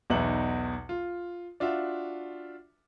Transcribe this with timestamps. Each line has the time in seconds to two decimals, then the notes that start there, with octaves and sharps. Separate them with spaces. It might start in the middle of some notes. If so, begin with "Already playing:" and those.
0.10 B1 E2 D#4 B4 E5 F#7
0.89 F4
1.60 D4 F4 F#4 E5